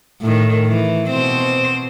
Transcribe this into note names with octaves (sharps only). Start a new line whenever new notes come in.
A2 D#3
E3
B2 C4 C5